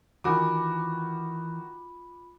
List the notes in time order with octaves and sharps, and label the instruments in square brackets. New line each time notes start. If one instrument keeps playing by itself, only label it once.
[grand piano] D#3 F#4 D6 [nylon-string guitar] E3 G#5 [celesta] F4 B5